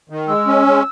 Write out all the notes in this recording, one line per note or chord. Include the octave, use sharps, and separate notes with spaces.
D#3
G#3 E6
C#4
G#3